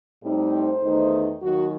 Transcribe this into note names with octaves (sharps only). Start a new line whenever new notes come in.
A2 G3 C4 D#4
C5
E2 D#3 A3 D#4
D#2 D#3 F#3 F#4